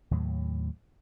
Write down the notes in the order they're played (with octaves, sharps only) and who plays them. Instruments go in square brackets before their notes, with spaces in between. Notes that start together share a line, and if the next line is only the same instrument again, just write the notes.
[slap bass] D#2 A2 F#3